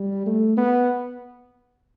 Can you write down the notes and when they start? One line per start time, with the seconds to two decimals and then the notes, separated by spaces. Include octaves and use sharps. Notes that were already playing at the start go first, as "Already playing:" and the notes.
Already playing: G3
0.26 A3
0.57 B3